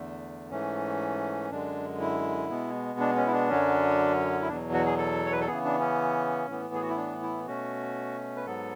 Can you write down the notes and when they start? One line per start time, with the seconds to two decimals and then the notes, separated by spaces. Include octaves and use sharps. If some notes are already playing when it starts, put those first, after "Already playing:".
Already playing: E2 D3 A3
0.50 G#2 E3 A3 C#4
1.50 F#2 D3 G#3 D4
2.00 E4
2.49 B2 G#3 B3
2.99 D4
3.17 C#4
3.27 E4
3.32 D4
3.49 F#2 D3 F#3 C#4
4.41 E4
4.48 E2 B2 F#3 D4
4.73 F#4
4.86 G#4
4.98 A4
5.26 C#5
5.32 B4
5.41 A4
5.47 C#3 E3 B3 G#4
5.65 D4
5.80 C#4
6.48 A2 E3 B3
6.74 G#4
6.82 F#4
6.89 E4
6.97 D4
7.22 E4
7.47 B2 A3 C#4 F#4
8.36 B4
8.46 G#2 F#3 B3 A4